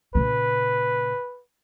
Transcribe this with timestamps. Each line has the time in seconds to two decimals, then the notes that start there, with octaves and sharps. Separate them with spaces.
0.15 A#2 C#3 B4